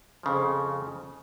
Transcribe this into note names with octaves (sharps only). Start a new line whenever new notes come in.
F2 C#3 F3